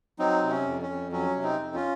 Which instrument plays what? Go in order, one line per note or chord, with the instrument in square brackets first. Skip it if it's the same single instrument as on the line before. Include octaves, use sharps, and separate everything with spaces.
[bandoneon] F#3 C4 D#4
C3
C#4
F2
C#4
F2
F#3 C#4
C3
C4 D#4
F2
C#4 F4